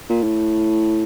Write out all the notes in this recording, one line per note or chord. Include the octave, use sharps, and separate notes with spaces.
A#2
A2